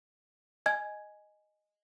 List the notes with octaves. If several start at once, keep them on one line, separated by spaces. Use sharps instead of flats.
D#5 G#5 G#6